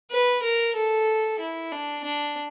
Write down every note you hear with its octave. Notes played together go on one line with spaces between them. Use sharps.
B4
A#4
A4
E4
D4
D4